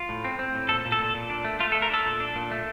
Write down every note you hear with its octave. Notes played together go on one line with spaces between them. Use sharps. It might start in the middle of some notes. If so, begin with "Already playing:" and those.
Already playing: F4
A2
C4
C4
A2
A#2 A4
A#2
A4
A#2
A#2
D4
A3
A3 F4
A4
A3
A#4
D4 A4
A#2
D4
A#2
A3